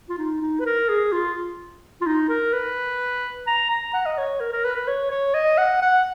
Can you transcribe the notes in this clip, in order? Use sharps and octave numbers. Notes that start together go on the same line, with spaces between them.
F4
D#4
D#4
B4
A#4
G#4
F4
F4
D#4
A#4
B4
A#5
A#5
F#5
D#5
C#5
A#4
A#4
B4
B4
C#5
C#5
D#5
F#5
F#5